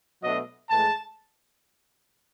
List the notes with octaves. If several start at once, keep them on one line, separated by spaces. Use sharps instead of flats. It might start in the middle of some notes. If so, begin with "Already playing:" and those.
B2 F#3 A3 D4 D#5
A2 E3 G#3 A5